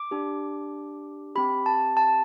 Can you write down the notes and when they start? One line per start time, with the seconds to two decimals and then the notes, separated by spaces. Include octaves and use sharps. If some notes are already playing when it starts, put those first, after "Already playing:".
Already playing: D6
0.11 D4 G4
1.35 C4 G4 B5
1.66 A5
1.97 A5